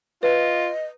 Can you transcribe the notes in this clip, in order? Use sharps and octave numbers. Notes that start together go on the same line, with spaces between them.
F4 B4 D#5